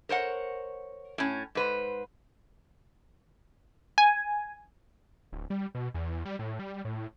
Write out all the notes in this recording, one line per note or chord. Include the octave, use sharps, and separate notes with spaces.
A#4 C5 C#5 F#5
A2 C#4
G#2 B4 C5
G#5
D1
G3
B2
E2
G3
A2
G3
A2